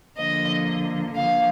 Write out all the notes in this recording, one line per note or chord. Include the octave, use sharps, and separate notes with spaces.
D3 F3 A#3 D#5
D3 F3 A#3 F5